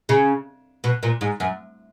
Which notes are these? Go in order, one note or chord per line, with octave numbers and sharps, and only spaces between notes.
C#3
B2
A#2
G#2
F#2